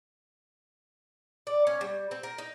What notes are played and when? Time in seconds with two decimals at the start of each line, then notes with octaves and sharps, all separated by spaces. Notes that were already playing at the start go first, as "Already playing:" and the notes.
1.47 D5
1.67 C#4
1.81 G3
2.11 C4
2.23 A#4
2.38 D#4